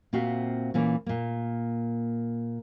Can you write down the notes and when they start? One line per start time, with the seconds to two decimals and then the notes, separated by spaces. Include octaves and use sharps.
0.13 A#2 C4 F#4 E5 F5
0.74 A#2 E3 A#3 C#4
1.06 A#2 A#3